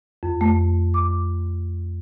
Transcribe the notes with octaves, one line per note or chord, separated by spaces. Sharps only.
F2
A3
D6